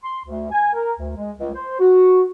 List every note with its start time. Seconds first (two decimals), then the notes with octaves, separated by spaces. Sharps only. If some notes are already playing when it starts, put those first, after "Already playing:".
0.03 C6
0.25 D2
0.51 G#5
0.73 A#4
0.98 D2
1.16 G#3
1.39 C#2
1.54 C5
1.80 F#4